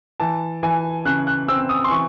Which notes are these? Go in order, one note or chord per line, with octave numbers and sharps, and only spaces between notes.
E3 A5
E3 G#5
C#3 F#6
F#6
C4 E6
D#6
C6
E3 C#6